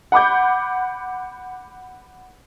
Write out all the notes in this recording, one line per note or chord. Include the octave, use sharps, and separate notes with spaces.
F#5 B5 D6 G6